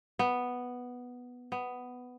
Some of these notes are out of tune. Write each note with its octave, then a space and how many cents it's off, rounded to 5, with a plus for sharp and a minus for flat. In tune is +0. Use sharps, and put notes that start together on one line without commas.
B3 +0
B3 +10